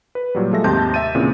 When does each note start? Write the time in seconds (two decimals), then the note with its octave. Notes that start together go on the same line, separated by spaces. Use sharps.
0.15 B4
0.35 A#2 F#3 G3
0.51 F3 G#3 A3 A4 E5 A#6
0.64 D#2 G#2 C3 A5 C6 G6
0.94 E5 A6 D#7
1.15 A#2 C#3 E3 C4